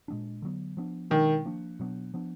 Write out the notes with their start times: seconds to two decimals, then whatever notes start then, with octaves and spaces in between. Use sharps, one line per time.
0.08 A#2 G#3 B3 D4
0.42 D3 F#3 B3
0.77 F3 B3 D4
1.10 B2 D#3 G#3 D4
1.45 F3 A#3 D4
1.79 B2 F#3 B3 D4
2.14 F3 B3 D4